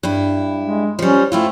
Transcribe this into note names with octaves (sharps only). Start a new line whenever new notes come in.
G2 E4
G#3
F3 G3 C#4
A3 C4 E4 F4